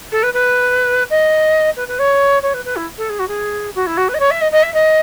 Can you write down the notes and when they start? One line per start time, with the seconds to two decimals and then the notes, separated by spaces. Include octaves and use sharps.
0.11 A4
0.23 B4
0.33 B4
1.10 D#5
1.76 B4
1.88 B4
1.99 C#5
2.42 C#5
2.53 B4
2.65 B4
2.76 E4
2.97 A4
3.09 G#4
3.19 F#4
3.27 G#4
3.75 F#4
3.86 E4
3.97 F#4
4.08 B4
4.14 D#5
4.19 C#5
4.30 E5
4.41 D#5
4.51 D#5
4.62 E5
4.74 D#5